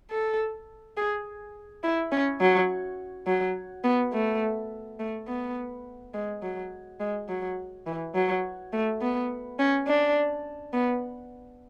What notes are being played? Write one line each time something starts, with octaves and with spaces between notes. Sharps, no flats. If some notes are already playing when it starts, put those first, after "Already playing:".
A4
G#4
E4
C#4
F#3
F#3
B3
A3
A3
B3
G#3
F#3
G#3
F#3
E3
F#3
A3
B3
C#4
D4
B3